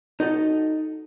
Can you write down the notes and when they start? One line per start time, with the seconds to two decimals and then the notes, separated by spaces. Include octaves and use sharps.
0.20 D#4 F#4 A4 D#5